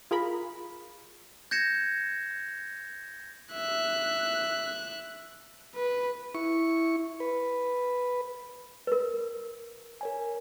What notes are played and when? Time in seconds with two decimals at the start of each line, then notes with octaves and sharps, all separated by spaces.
0.11 F4 G#4 A#4 B5
1.51 G6 G#6 A#6 C#7 E7
3.53 E5 F#6
5.75 B4
6.35 E4 C#6
7.20 B4
8.87 A#4 B4
10.01 A#4 C#5 G#5